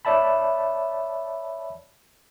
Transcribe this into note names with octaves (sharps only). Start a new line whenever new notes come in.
C#5 D5 E5 A5 B5